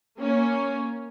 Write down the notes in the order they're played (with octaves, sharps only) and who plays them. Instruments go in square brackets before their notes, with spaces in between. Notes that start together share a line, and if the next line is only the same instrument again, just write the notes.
[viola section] A#3 C#4